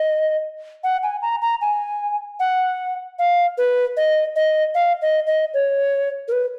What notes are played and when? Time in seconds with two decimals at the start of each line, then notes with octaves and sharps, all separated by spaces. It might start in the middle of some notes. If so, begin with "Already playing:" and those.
Already playing: D#5
0.84 F#5
1.03 G#5
1.22 A#5
1.42 A#5
1.61 G#5
2.40 F#5
3.19 F5
3.58 B4
3.97 D#5
4.36 D#5
4.75 F5
5.02 D#5
5.27 D#5
5.54 C#5
6.28 A#4
6.32 B4